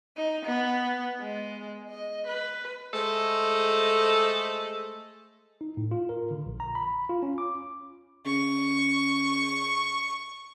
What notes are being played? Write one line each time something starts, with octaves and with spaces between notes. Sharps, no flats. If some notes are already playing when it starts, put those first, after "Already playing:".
D#4
B3
G#3
D#5
B4
G#3 A3 A4 C5 D#5
D#4
A2
F4
A#4
D3
A#1
A#5
B5
F4
C#4
D6
C#3 C#6